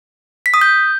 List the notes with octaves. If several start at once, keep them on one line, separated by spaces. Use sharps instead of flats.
B6
D#6
G6